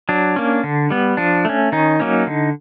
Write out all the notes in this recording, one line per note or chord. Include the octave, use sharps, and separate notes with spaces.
F#3 D4
A#3 C#4
D3
G3 B3
F3 D4
A3 C#4
D#3 C#4 D#4
F#3 A#3 C#4
D3